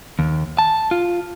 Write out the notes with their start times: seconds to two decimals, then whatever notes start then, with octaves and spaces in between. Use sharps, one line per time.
0.19 D#2
0.58 A5
0.91 F4